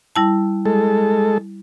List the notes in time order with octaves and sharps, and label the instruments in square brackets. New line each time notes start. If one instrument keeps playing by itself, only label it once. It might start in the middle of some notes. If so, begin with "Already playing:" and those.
[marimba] G3 E4 A5
[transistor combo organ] G#3 A4